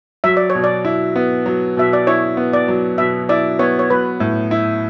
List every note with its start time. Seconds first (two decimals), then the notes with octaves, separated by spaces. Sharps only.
0.24 F#3 E5
0.37 D5
0.50 C#5
0.55 B2
0.64 D5
0.85 E4
1.16 B3
1.46 F#3
1.77 B2 E5
1.93 D5
2.07 E4 C#5
2.37 B3
2.53 D5
2.68 F#3
2.98 B2 E5
3.29 E4 D5
3.59 B3 C#5
3.79 C#5
3.90 F#3 B4
4.20 A2
4.51 E4